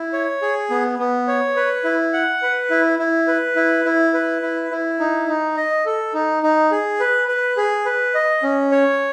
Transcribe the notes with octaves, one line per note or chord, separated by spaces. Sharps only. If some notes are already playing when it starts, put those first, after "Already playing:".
Already playing: E4
C#5
G#4
B3
B3
C#5
B4
E4
F#5
B4
E4
E4
B4
E4
E4
B4
E4
E4
D#4
D#4
D#5
A4
D#4
D#4
G#4
B4
B4
G#4
B4
D#5
C#4
C#5